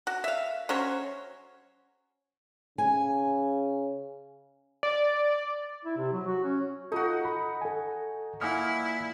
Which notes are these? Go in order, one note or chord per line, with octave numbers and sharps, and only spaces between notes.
F#4
E5 F5
F#3 C#4 C5 C#5
C#3 G#5
D5
E4
C3
F#3
F#4
C#4
D#4 F4 F#4 A4
B5
A4 G#5
A#2 E4 F#5 G#5 D#6 F6